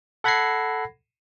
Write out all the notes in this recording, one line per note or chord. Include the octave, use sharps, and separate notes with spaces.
A4 F#5 B5 G#6 A#6 C7